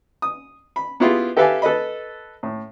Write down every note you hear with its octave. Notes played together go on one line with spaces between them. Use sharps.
D#6
B5
B3 E4 F4 G4 G#4
G4 A4 B4 E5 F5 G#5
A4 B4 D#5 B5
A2